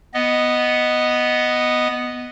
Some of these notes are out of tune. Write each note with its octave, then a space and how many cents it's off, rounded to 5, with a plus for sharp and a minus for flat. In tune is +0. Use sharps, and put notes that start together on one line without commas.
B3 +0 D#5 +0